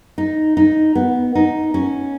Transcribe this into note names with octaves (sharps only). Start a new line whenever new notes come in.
D#4
D#4
B3
D#4
C#4